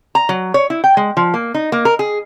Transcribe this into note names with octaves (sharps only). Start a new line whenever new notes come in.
A#5
F#3
C#5
E4
G5
G#3
F3
A#3
D#4
A#3
A#4
G#4